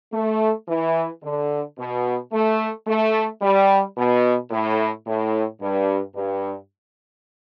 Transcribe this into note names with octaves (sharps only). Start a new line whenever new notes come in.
A3
E3
D3
B2
A3
A3
G3
B2
A2
A2
G2
G2